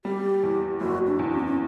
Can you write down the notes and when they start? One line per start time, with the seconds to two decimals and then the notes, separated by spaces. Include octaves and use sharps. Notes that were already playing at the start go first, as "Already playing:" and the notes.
0.05 G3 G4
0.43 E2
0.81 F#1 F#4
1.07 D4
1.19 E2
1.32 C#4
1.39 B3
1.46 C#4